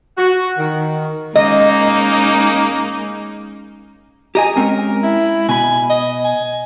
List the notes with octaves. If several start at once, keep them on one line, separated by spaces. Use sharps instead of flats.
F#4
D#3
G#3 A#3 C#4 D#4 D#5
G4 D#5 G#5 A#5
G#3 C4 C#4 A#4
E4
B2 G#5 B5
D#5
G#5